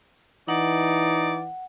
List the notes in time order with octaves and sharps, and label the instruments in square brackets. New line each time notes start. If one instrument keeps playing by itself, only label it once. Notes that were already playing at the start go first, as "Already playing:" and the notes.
[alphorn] E3 [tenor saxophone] D#4 [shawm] D5 [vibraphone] F#5